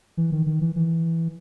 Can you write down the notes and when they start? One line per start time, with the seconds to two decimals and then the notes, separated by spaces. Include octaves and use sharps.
0.17 E3
0.32 D#3
0.46 D#3
0.61 E3
0.76 E3